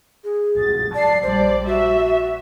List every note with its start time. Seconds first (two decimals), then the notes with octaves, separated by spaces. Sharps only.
0.24 G#4
0.59 A6
0.95 D5 A5 C7
1.23 A#1 G3 C5 D5
1.66 F#4 E5